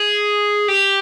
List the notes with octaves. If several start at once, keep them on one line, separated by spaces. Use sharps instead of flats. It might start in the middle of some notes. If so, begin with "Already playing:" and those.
Already playing: G#4
G4